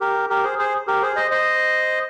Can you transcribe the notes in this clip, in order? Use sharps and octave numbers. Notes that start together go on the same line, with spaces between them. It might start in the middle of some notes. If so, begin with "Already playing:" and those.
G4 A#4
G4 A#4
G#4 C5
G#4 C5
G4 A#4
G#4 C5
C5 D#5
C5 D#5